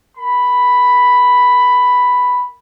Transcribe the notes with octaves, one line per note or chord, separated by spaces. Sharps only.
A#4 B5